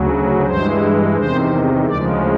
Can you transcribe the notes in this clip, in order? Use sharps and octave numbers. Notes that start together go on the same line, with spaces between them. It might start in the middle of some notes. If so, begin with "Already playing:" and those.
Already playing: D2 C#3 F#3
G2 E3 G#3 C5
E2 C3 D#3 C5
D2 C#3 F3 G#3 D5